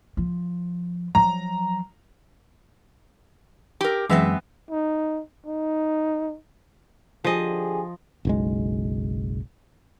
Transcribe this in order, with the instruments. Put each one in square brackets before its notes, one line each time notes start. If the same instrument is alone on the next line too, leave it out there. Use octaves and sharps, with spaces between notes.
[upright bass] F3
[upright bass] F3 F#3 [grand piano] A#5
[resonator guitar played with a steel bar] G4 A#4
[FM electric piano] F#2 G#3 E5 [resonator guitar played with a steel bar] E3 B3 C4
[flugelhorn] D#4
D#4
[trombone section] D3 G4 G#4 [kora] F3 D#5
[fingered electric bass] F#1 B1 G#3